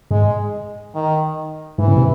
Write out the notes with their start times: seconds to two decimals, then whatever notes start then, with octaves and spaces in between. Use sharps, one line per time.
0.11 G#2 G#3
0.95 D#3
1.78 G#2 E3
1.88 C#3
1.96 C3